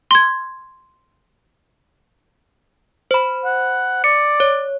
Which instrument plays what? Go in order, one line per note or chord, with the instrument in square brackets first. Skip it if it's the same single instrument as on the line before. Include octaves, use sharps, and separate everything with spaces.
[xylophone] C6 G#6
[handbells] C5 B5
[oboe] F#5
[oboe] D5 [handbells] C#7
[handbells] C#5